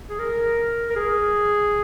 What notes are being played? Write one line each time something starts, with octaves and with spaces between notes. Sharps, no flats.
G#4
A#4
A#4
G#4